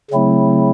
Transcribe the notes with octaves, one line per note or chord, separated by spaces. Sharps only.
C#3 F#3 A3 C4 E4